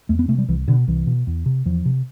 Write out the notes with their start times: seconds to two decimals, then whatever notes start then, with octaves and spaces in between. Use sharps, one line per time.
0.09 E2 A3
0.19 B3
0.28 C3 A3
0.38 G3
0.48 C2 E3
0.68 B2 D3
0.88 C2 E3
1.07 B2
1.27 E2
1.46 C3
1.66 E2 F3
1.86 C3